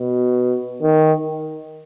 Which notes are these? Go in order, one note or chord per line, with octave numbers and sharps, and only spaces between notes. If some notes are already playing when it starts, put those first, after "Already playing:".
Already playing: B2
D#3